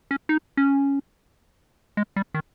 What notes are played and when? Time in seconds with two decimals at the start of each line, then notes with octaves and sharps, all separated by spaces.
0.11 C#4
0.29 D#4
0.57 C#4
1.97 G#3
2.16 G3
2.34 D#3